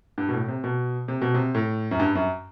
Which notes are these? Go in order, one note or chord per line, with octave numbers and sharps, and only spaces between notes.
G2
B2
A2
C3
B2
C3
B2
C3
A2
F#2
G2
F#2